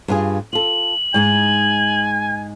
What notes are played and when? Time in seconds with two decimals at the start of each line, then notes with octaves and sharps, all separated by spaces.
0.08 G2 F4 G#4
0.53 F4 A4 F#7
1.14 G#2 G#3 D#4 G#5